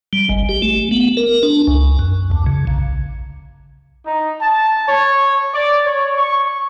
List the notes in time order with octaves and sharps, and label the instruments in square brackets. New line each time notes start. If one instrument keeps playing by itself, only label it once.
[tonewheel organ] G3
G#1
G4
A3
B3
A#4
D4
C#2
F#2
D2
C#3
A#1
[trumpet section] D#4
A5
C#5
D5
C#5
C#6